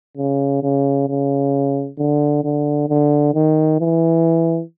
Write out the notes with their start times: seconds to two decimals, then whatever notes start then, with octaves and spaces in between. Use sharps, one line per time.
0.17 C#3
0.63 C#3
1.08 C#3
1.98 D3
2.44 D3
2.89 D3
3.34 D#3
3.80 E3